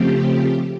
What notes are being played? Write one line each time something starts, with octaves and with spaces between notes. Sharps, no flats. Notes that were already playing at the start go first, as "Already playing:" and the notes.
Already playing: C#3 F3 A3 C4 G4